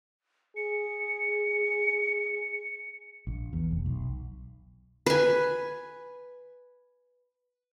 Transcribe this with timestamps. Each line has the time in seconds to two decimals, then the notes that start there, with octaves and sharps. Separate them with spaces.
0.56 G#4 C#7
3.27 A#1
3.53 E2
3.71 F1
3.86 B1
5.06 B4 G#5